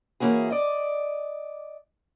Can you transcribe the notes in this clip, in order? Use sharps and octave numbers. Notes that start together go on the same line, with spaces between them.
E3 A#3 C#4 F#4 G#4
D5 D#5